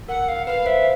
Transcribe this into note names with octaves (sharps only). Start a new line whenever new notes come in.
A#4 F#5
F5
B4 F5
C5 E5